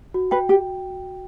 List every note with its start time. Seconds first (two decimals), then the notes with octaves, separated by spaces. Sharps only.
0.14 F#4
0.31 B4 G5
0.48 G4 G5